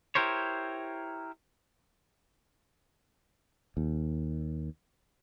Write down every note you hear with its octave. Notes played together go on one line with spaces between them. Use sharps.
E4 G4 A#4 C5 C#5
D#2